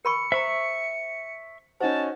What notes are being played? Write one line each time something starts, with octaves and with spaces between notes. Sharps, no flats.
A#4 B5 C#6 C#7
C5 E5 A#5 C#6
C#4 D#4 F#4 C5 A5